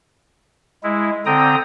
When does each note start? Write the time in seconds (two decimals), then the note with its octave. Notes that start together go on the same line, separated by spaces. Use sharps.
0.83 G#3 E4
1.26 D3 C4 G5 A#5 D#6